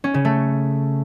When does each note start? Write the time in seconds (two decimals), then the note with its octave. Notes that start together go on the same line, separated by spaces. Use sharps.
0.04 C#4
0.14 C#3
0.25 A3